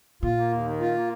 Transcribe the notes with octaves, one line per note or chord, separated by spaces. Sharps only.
A#2 F4
A#3
D#2
D#3
F4
A#3